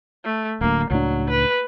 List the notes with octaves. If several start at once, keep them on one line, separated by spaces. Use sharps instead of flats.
A3
D1 D2 A#3
C#2 A2 F#3 D4
B4